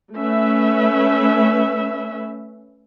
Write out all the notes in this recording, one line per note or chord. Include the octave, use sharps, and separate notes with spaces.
A3 C#4 B4 E5